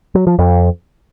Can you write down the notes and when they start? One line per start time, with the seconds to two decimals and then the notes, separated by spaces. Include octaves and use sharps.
0.15 F#3
0.27 F3
0.39 F2